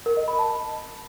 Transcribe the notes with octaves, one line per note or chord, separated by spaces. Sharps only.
A#4
D#5
B5
A5